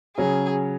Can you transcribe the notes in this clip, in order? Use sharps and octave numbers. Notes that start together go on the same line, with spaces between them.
C#3 F#3 C#4 G#4